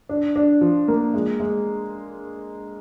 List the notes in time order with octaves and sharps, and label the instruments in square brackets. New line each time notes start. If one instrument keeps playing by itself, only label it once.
[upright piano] D4
D4
F3
A#3
G#3
G#3